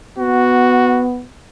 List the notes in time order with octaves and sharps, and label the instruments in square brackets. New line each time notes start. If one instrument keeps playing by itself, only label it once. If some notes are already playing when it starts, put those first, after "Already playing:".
[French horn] B3 [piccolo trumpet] F#4